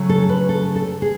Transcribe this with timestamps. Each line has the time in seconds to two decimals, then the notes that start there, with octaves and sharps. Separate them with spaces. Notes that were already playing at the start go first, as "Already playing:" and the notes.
Already playing: C#3 F#3 A3
0.09 A4
0.29 B4
0.49 A4
0.76 A4
1.02 G#4